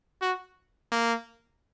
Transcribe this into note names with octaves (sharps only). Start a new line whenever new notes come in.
F#4
A#3